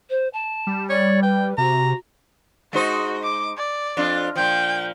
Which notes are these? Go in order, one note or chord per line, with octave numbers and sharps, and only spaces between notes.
C5
A5
G3
C#5 D5
B4 G5
C3 F#4 A#5
G#3 D#4 F#4 C5
D6
D5
F2 D4 F4
A#2 F3 G5